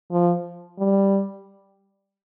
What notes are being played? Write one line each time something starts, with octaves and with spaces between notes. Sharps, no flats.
F3
G3